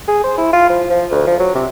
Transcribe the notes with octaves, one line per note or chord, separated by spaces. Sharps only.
G#4
C5
E4
F4
F3
F3
D2
F3
F#3
C3